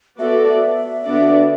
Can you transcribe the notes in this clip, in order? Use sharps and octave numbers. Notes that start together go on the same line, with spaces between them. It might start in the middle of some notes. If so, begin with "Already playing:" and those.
B3 F#4 A4 D5 E5
D3 B3 D4 F#4 D5